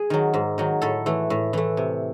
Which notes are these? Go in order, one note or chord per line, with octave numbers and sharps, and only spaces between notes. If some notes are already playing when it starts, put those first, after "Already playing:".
Already playing: G#4
D#3 F#3
G#2
D#3 F#3
A2 A4
E3 A3
A2
E3 A3
C3